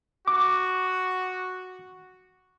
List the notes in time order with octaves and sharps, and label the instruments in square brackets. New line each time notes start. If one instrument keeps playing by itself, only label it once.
[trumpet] F#4 [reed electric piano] D6